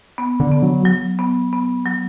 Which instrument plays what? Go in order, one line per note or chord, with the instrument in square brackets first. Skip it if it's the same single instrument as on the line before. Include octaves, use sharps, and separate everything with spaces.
[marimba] B3
[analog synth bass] D3
[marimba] B3
[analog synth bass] F#3
[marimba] F#3
B3
B3
F#3